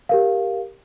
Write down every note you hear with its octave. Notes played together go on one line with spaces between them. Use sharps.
G4 A#4 F5